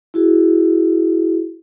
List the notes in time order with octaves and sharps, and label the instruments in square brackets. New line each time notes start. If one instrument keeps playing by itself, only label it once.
[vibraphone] E4 F#4 G#4